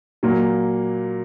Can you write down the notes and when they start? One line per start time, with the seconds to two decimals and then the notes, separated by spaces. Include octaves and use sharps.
0.23 A#2 F#3 A#3